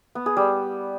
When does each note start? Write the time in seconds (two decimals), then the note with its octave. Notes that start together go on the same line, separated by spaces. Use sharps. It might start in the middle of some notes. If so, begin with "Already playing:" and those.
0.15 B3
0.26 G#4
0.37 G3